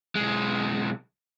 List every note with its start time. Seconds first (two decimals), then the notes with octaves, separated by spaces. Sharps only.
0.15 B1 G#3